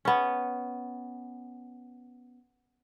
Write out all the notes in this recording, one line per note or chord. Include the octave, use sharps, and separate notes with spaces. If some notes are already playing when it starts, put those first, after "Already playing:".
B3 C#4